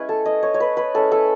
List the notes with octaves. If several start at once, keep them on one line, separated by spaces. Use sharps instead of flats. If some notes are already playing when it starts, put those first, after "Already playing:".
Already playing: G#3 C#4 E4 B4 C#5
A4
D#5
C#5
C#5
B4
B4
G#3 C#4 E4 A4
A4